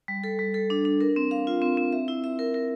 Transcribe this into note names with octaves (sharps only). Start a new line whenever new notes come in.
G3
A4
G3
A4
D4
D4
A#4
C4
F5
F4
C4
C4
E5
E4
E5
A#4
A#4